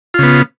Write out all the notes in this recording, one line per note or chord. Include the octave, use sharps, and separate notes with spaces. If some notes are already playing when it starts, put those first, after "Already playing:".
C#3 B3 F4